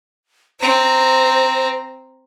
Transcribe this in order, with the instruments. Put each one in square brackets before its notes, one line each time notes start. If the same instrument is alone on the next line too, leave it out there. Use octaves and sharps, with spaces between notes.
[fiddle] C4 A#5 [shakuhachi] C5